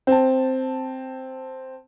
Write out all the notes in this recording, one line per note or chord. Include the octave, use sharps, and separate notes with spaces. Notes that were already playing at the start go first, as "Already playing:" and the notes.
C4 A5